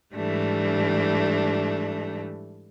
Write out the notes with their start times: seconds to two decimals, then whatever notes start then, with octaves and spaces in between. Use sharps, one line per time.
0.15 G#2 E3 G3 A3 D4